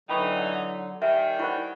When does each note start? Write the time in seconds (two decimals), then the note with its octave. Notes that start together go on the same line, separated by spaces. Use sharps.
0.09 D3 E3 F#3 D#4 G5 B5 C#6
0.38 F#5
1.02 D#3 G3 E5 G#5
1.39 E4 C5 F#5 B5 C#6